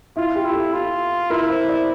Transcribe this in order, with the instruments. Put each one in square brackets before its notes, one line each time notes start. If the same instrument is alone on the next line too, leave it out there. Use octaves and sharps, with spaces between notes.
[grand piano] E4 [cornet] F4
[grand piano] G4
[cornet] E4
[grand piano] A4
[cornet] F4
[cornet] E4 [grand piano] A#4
[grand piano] C5
D5